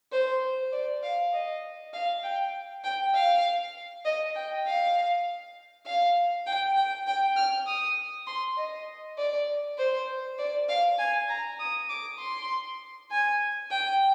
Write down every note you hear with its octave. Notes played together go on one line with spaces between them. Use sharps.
C5
D5
F5
D#5
F5
G5
G5
F5
D#5
G5
F5
F5
G5
G5
G5
F6
D#6
C6
D#5
D5
C5
D5
F5
G#5
A#5
D#6
D6
C6
G#5
G5